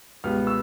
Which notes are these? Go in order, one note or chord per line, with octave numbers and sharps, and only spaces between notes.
C#2 B2 G3 B3 F6
E6